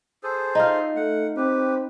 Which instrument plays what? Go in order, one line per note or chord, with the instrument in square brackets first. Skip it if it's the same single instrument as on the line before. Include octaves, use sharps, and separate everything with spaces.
[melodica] G#4 A4 C5
[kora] D#4 F4
[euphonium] A3 [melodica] F#5
[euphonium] C4 [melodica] G4 B4